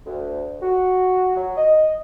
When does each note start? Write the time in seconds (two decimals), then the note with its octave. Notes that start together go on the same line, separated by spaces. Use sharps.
0.06 D2
0.62 F#4
1.35 F#3
1.56 D#5